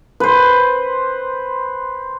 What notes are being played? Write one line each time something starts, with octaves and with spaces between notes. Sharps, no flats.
B4 C5